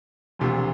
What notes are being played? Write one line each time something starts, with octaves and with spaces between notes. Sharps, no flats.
E1 D2 C3 F3 A3